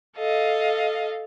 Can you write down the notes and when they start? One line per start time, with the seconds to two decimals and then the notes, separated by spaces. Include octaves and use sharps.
0.17 A4 D#5 F5